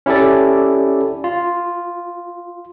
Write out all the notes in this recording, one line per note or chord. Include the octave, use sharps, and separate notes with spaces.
C#4 E4 G4 A4 D5
F4